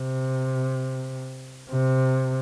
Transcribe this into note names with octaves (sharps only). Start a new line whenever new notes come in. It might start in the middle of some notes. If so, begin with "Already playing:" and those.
Already playing: C3
C3